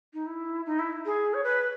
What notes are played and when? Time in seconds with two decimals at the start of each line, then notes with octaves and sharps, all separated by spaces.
0.14 D#4
0.26 E4
0.66 D#4
0.79 E4
1.06 G#4
1.34 C#5
1.44 B4